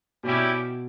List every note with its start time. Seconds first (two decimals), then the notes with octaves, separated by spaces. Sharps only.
0.23 B2 G3 C#4 E4 G4